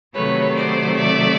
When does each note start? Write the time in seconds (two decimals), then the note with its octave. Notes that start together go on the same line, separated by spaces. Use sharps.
0.14 C3 D#3 F#3 A3 B4 C#5
0.55 C5 D5
0.97 D5 E5